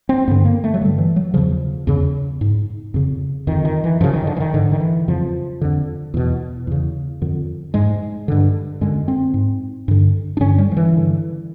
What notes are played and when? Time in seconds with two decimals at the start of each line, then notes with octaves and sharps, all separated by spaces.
0.09 C4
0.28 G2 D3 B3
0.45 A#3
0.64 A3
0.74 F#3
0.81 G2 D3 G3
0.98 E3
1.16 F#3
1.34 E2 C#3 F3
1.87 E2 C#3
2.41 G#2
2.94 F2 C#3
3.47 F2 D3 D#3
3.65 D#3
3.84 E3
4.01 F#2 C#3 F3
4.14 D#3
4.27 D3
4.37 E3
4.40 D#3
4.54 G#2 D3
4.72 D#3
4.80 E3
5.08 F2 C#3 F3
5.61 F2 D3
6.14 E2 B2
6.67 E2 C#3
7.22 F2 D3
7.74 G#2 G#3
8.28 G2 D3
8.81 F#2 D3 G#3
9.08 C4
9.34 G#2
9.88 G2 D3
10.37 D4
10.41 G2 D3 C#4
10.58 G3
10.72 F3
10.77 E3
10.94 G2 D3